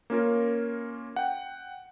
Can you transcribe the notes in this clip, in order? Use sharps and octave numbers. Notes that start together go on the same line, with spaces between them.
A#3 C#4 F4 A#4
F#5 G5